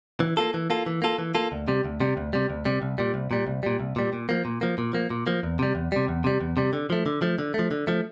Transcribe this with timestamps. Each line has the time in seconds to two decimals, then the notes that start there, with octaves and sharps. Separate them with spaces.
0.20 E3
0.37 A#3 F4 A4
0.54 E3
0.70 A#3 F4 A4
0.86 E3
1.02 A#3 F4 A4
1.18 E3
1.35 A#3 F4 A4
1.52 D2
1.68 C3 G3
1.85 D2
2.00 C3 G3
2.17 D2
2.33 C3 G3
2.50 D2
2.65 C3 G3
2.82 C2
2.98 A#2 G3
3.14 C2
3.31 A#2 G3
3.47 C2
3.63 A#2 G3
3.79 C2
3.96 A#2 G3
4.13 A#2
4.29 F3 A#3
4.45 A#2
4.61 F3 A#3
4.78 A#2
4.93 F3 A#3
5.10 A#2
5.27 F3 A#3
5.43 E2
5.59 C3 G3
5.75 E2
5.92 C3 G3
6.08 E2
6.24 C3 G3
6.41 E2
6.57 C3 G3
6.73 D3
6.90 F3 A3
7.06 D3
7.22 F3 A3
7.39 D3
7.54 F3 A3
7.71 D3
7.87 F3 A3